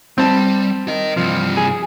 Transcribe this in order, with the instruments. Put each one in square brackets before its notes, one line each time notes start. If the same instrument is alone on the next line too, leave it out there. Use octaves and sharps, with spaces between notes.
[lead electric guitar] G3 [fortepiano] C4 A5
[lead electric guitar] A#4 D#5
[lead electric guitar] G2 C3 [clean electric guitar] F3
[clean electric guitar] G#4